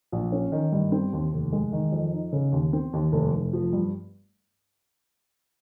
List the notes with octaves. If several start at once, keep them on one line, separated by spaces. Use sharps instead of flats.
A#1
C#4
D#3
G2
C4
D#2
F1
G#3
D#3
F2
D#4
C#3
D#2
C4
D#2
F1
F1
F3
G2